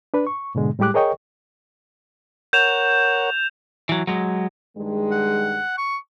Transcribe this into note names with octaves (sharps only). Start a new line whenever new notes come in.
D4 B4
C#6
G#2 B2 D3 G#3
A2 G3 G#3 G4 D6 F#6
G#4 A#4 C#5 D#5 G5 C#6
A#4 C#5 F#5 G6 E7 F7
E3 F#3
F#3 G#3
G2 D#3 G#3
F#5
C#6